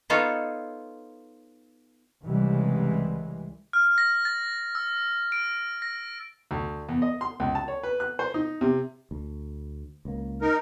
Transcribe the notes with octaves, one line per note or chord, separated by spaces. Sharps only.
B3 D#4 F4 A4 C#5
C2 C#3 E3 G3 G#3
F6
A#6
A6
E6
D7
A#6
D2
E2
D#5
C6
C#2
A5
C#5
B4
F#6
C5
D#4
C3
D2
C#2 A#3
D#4 A#4